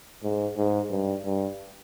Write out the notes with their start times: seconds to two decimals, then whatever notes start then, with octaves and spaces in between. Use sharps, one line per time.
0.23 G#2
0.57 G#2
0.91 G2
1.25 G2